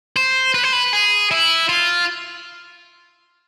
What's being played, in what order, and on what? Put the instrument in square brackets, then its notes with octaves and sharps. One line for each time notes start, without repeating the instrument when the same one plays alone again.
[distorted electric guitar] C5
B4
C5
B4
G#4
E4
F4